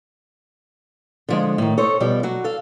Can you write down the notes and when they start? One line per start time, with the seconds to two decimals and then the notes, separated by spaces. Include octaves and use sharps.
1.29 D3 F3 G#3
1.58 A2 D#3
1.78 A4 C5 C#5 D#5
2.00 B2 F3 G3
2.23 F#3 F#4
2.44 A4 F5